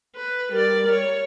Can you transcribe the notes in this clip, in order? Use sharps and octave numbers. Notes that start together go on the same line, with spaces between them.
B4
G3 A#4 D5
C#5